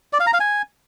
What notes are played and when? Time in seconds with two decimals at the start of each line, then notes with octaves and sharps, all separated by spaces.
0.13 D5
0.20 F5
0.27 A#5
0.33 F5
0.40 G#5